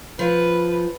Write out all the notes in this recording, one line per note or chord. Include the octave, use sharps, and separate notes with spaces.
F3 B4